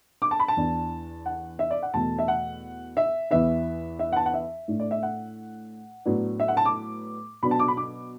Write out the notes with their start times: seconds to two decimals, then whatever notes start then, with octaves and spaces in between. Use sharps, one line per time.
0.22 D6
0.31 A5
0.40 B5
0.48 A5
0.57 E2 E3 D4
1.26 F#5
1.59 E5
1.71 D5
1.83 F#5
1.94 E2 B2 A3 A5
2.19 E5
2.28 F#5
2.97 E5
3.31 E2 E3 B3 E5
3.99 E5
4.12 F#5
4.16 A5
4.26 F#5
4.34 E5
4.68 A2 A3 D4
4.80 D5
4.91 E5
5.03 F#5
6.05 A2 F#3 B3 D4
6.40 E5
6.48 F#5
6.57 A5
6.65 D6
7.43 B2 F#3 B3 D4 B5
7.51 A5
7.59 D6
7.68 B5
7.77 D6